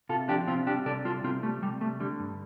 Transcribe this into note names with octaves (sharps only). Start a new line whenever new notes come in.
C3 F4 A4
F3 D4 G4
C3 C4 F4
G3 D4 G4
C3 A4 D5
G3 F4 A4
C3 C4 F4
G3 A3
C3 G3
G3 A3
D3 G3
G2